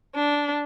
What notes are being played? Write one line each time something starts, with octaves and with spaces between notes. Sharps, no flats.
D4